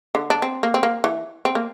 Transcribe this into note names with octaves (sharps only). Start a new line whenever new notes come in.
D3
D4
C4
A#3
C4
A#3
E3
C4
A#3